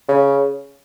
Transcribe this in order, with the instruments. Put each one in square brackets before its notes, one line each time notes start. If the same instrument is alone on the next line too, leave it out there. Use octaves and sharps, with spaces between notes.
[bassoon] C#3